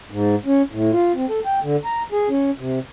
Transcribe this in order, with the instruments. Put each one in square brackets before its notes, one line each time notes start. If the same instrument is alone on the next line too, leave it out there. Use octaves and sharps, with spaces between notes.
[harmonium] G#2
C#4
A2
F4
C4
A4
G5
D3
A#5
G#4
C#4
C3